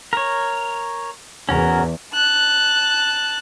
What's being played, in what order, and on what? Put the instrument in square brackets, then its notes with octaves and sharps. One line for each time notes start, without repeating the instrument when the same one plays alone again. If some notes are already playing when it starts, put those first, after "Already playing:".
[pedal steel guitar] A#4 C#5
[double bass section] E2 [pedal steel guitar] C#4 F#4 A#4
[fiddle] A5 F#6